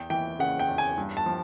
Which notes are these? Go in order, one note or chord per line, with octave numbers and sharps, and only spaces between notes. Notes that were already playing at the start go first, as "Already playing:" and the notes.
Already playing: E2 G5
E3 G5
C#3 F#5
G5
E2
G#5
G2
A5
F3